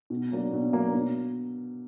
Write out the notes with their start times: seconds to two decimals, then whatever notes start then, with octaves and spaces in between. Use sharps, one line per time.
0.10 B2
0.31 F#3 A#3 D4
0.53 B2
0.73 F#3 A#3 D4
0.94 B2